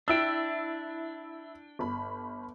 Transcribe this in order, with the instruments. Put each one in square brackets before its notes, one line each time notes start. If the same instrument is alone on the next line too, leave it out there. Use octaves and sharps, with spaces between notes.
[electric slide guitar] D4 G5 [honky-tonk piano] E4 E6
[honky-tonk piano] G1 B5